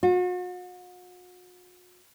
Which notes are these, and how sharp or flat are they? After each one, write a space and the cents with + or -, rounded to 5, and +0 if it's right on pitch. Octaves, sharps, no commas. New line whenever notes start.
F#4 -45